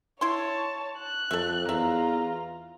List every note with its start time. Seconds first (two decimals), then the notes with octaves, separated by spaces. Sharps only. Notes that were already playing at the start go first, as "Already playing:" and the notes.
0.21 E4 C#5 A5 C6
0.99 F#6
1.31 F2 A4 E5
1.69 E2 F4 E5 A#5